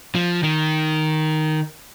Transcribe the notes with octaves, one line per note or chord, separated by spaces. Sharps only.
F3
D#3